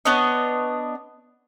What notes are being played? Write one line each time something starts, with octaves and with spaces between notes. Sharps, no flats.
B3 D4 C#5 D#5